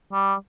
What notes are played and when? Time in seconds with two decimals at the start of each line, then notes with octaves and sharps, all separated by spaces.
0.13 G3